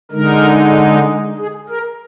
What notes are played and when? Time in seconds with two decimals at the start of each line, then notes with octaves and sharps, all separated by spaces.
0.11 D3 G#3 D#4 A#4
1.38 G#4
1.69 A#4